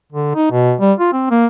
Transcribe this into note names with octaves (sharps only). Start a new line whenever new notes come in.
D3
D#4
B2
G3
F4
C4
A#3